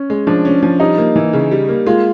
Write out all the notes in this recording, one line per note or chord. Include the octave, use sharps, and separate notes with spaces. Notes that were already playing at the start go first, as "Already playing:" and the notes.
Already playing: C#4
G#3
F3 D4
C#4
F3
G3 D#4
A#3
E3
C#3
G3
A#3
G#3 F4